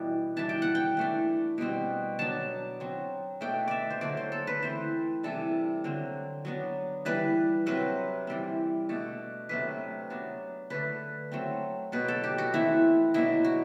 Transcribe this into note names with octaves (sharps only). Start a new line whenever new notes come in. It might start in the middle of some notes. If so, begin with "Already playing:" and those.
Already playing: B2 E3 G3 D4
E3 G3 D4 A5
G5
F#5
G5
E3 A3 D4
B2 G3 C4
F#3 B3 D4 A5
F#3 C4
B2 A3 D4 G5
D5 E5
C5
D3 F#3 A3 D4 D5
C5
A4
B4
E3 A3 C4 C5
C3 E3 G3 D4 A4
D3 F#3 C4
F#3 B3 D4
E3 G3 D4 B4
C3 F#3 C4 B4
E3 G3 C4
B2 A3 D4
C3 F#3 A3 D4 B4
F#3 B3 D4
D3 A3 D4 B4
F#3 A3 C4
B2 F#3 B3 B4
A4
G4
F#4
E3 A3 C4 E4
B2 F#3 B3 D4 E4
F#4